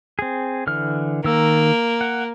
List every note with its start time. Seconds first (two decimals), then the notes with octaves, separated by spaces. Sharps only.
0.19 C4 G#4
0.67 D3 E3 F6
1.24 D#3 A#3 E6
2.01 F#5